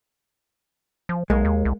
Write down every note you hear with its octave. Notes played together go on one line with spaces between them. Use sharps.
F3
B1 G#3 A#3
D#2
C2